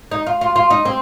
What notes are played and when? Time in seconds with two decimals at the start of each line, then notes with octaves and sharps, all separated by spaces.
0.11 D#4
0.26 F4
0.41 F4
0.56 F4
0.70 D#4
0.85 C4